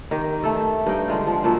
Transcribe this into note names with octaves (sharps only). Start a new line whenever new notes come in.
D#3 G4
A3 A4
G2 D#4 G5
D3 G#3 F4
F3
A#2 F#3 A4